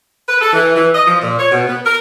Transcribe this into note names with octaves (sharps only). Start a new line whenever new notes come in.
B4
A4
E3
E3
D#5
F3
A#2
C#5
B2
B3
A#4